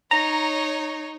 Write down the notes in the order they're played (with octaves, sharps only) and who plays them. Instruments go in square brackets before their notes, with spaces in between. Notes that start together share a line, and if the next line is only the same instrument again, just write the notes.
[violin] D#4 C#5 [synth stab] A#5